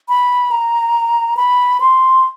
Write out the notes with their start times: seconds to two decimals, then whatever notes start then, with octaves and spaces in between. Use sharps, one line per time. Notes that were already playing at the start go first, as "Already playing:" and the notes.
0.09 B5
0.51 A#5
1.37 B5
1.80 C6